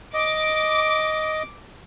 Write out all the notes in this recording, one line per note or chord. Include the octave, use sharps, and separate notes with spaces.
D#5 D6